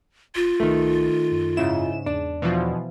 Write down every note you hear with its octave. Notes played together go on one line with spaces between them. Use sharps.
F1 F4
C2 D#3 A3
F#2
G#2 C#3 E4 E7
E2 D4
B2 E3 F3